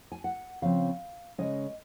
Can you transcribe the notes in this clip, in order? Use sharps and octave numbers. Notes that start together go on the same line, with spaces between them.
G#5
F#5
C#3 F3 C4 F5
C#3 G#3 C#4 D#5